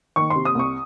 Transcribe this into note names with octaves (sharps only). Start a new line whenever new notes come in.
D#3 C#6
C6
C3
D#6
C2 C#6